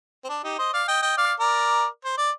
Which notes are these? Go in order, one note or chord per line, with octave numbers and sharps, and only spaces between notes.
C4
D4
D#4 G4
C5 D#5
D5 F5
D#5 G5
D#5 G5
D5 F5
A#4 D5
C5
D5